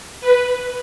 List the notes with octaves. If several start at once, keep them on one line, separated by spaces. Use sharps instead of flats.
B4